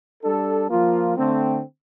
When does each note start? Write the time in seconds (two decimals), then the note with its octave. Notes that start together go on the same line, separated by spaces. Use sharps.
0.24 G3 D4 A4
0.70 F3 A#3 F4
1.16 D3 A3 C4